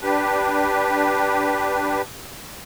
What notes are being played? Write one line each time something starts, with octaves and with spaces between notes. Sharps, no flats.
D4 G4 B4